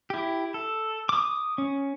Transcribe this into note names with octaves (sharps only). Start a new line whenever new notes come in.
E4 G4
A4
D6 D#6
C#4